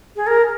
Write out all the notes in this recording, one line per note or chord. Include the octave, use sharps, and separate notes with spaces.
G#4
A#4